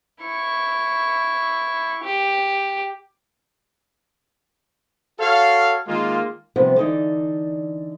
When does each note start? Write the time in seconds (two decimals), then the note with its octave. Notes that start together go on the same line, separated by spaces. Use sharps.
0.22 E4 C#6
2.04 G4
5.19 F#4 A4 C#5 F5
5.87 D#3 G#3 A#3 F4
6.56 C3 F3 G3 B3 C4
6.76 D3 E3 D#4 D5